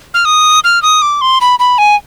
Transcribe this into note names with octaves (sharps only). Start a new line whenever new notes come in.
F6
D#6
F6
D#6
D6
C6
B5
B5
G#5